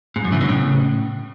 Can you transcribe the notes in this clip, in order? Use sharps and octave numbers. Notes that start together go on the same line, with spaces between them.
G#2
F#2
C#3 E3
B2 D3
A2 C#3